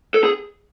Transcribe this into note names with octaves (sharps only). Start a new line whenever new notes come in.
A4
G#4